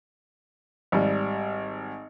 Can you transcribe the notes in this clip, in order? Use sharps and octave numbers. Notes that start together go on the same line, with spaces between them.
G#1 G3